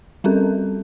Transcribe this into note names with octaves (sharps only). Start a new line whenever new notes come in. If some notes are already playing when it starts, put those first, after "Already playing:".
G3 C4 C#4 A4 A#4